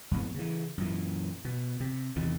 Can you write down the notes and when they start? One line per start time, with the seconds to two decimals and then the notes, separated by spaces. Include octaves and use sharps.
0.11 F2 A2 B3
0.35 C#3 E3
0.78 F#2 A#2 E3
1.45 B2
1.80 C3
2.16 E2 C3 D#3